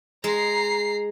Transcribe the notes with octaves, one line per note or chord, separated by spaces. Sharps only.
G#3 A#5 C7